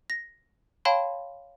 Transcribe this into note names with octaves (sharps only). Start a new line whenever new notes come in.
A#6
C#5 F5 G5 A5 B5 C6